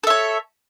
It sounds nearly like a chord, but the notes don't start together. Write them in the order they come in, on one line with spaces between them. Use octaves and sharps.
A4 E5 C#5